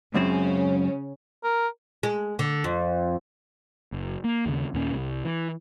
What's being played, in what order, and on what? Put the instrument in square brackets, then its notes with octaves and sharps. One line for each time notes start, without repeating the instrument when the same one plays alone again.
[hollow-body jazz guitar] C#2 F#2 C4 [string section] C#3 C#4
[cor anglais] A#4
[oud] G#3
D3
F2
[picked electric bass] F#1
A#3
D#2 C#3
D#2 A#2 C#4
C2
E3